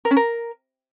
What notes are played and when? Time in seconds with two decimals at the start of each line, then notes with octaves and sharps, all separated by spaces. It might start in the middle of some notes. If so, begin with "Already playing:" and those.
0.05 A#4
0.11 C#4
0.17 A#4